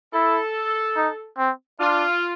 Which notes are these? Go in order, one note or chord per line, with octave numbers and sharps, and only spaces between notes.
E4 A4
D#4
C4
D4 F4